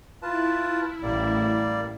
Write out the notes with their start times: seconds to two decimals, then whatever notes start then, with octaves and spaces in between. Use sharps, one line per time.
0.22 E4 F4 B4 A5
1.03 A1 G3 A#3 D5